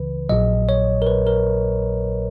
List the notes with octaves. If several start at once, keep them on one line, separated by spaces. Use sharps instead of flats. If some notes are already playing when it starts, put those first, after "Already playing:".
Already playing: C#2 C#3 E3 B4
A#1 A#2 F#3 D#5
C#5
A#4
B4
A#4